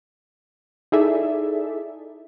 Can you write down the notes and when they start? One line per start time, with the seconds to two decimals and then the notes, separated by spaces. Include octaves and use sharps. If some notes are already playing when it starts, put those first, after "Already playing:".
0.92 D#4 E4 G#4 A4 D5 E5